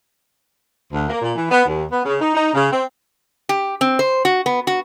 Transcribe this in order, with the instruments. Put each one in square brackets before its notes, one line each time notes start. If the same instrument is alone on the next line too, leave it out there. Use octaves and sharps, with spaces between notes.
[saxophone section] D2
A#3
A#2
E3
B3
D#2
B3
C#3
D#4
D#4
C#3
C4
[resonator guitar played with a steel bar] G4
C4
C5
F#4
B3
F#4